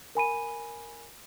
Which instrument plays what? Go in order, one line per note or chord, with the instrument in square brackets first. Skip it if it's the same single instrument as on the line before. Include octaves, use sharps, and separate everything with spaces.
[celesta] A#4 G#5 B5 D#7